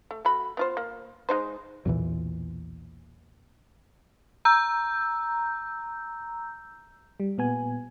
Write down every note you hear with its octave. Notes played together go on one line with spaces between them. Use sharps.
A3
A3 F#4 B5
B3 F4 C5
A#3
G#3 D#4 C5
B1 E2 A#2 E3
A#5 E6 G6
G3
A#2 B3 G#5